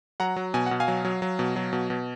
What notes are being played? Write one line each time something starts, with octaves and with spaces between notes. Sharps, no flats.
F#3 F#5 A#5
F#3
B2 G#5
B2 F#5
F5 G#5
F#3
F#3
F#3
B2
F#3
B2
B2